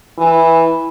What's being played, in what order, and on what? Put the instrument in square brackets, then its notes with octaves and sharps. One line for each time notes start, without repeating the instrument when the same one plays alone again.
[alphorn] E3